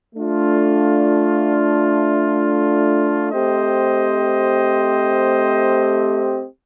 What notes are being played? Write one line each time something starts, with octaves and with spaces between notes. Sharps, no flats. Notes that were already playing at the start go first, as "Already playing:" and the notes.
A3 D4 F4
A3 C4 G4 C5 D#5